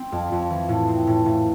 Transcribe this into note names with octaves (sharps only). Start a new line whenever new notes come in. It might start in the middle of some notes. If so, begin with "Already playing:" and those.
Already playing: C4
F2
F2
E3
A2
C4
A2
A2